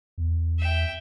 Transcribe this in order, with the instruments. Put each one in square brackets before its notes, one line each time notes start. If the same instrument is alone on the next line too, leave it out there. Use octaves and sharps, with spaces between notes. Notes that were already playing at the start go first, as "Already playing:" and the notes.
[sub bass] E2
[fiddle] E5 G5